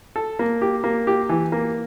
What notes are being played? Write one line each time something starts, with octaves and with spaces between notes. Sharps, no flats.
A4
A#3
G4
A#3
G4
E3
A#3